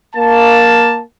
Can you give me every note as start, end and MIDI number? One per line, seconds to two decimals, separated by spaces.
0.16 1.00 58
0.16 1.00 81